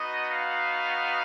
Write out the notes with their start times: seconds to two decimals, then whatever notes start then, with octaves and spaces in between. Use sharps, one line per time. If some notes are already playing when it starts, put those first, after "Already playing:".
Already playing: B3 D#4 F#4 D#5
0.30 F5